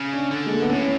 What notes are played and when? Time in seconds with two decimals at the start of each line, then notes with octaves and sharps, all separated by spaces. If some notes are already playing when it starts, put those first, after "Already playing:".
Already playing: C#3
0.13 D4
0.31 D3
0.46 G#3
0.54 A3
0.62 B3
0.69 A2 C#4